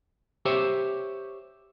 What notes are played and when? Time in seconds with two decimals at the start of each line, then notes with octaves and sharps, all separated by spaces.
0.45 G4 C5 C#5 E5